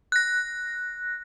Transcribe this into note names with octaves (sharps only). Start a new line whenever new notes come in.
F#6 A#6